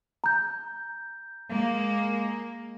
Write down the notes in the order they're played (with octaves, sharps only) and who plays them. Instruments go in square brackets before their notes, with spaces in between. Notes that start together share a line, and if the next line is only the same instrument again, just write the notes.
[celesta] A#5 G6
[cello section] G#3 A#3